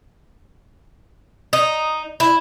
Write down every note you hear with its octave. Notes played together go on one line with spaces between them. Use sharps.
D#4
E4